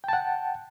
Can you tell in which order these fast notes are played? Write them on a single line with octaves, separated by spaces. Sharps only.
G5 A5 F#5